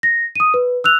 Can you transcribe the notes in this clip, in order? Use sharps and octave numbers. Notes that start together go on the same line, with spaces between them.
A#6
D#6 D#7
B4
E6 F#6 F7